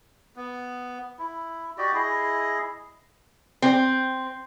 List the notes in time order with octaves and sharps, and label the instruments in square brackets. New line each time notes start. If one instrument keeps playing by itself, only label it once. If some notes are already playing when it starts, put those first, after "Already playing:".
[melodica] B3
E4
F#4 G4 D5 D#5
E4 G#4 D#5
[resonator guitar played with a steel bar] C4